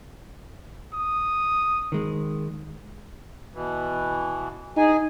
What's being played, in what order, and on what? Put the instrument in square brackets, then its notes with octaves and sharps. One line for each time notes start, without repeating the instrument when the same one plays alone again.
[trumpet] D#6
[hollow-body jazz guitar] D#3 G#3
[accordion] B2 E3
[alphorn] D#4 [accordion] G#4 G#5